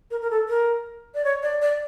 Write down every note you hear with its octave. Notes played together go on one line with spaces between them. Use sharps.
A#4
A#4
A4
A#4
D5
C#5
D5
D5